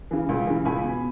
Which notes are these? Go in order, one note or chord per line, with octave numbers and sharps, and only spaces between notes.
C#3 E3
C#2
C#3 E3
C#2 G#5 B5
B2